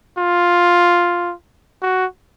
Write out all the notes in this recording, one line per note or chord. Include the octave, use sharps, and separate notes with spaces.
F4
F#4